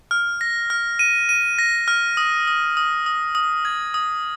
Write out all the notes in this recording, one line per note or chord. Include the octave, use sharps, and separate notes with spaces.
F6
A#6
F6
D#7
D#7
A#6
F6
D#6
D#6
D#6
D#6
D#6
G#6
D#6